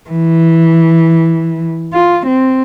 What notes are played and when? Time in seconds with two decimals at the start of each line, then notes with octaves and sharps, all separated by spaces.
0.10 E3
1.94 F4
2.26 C4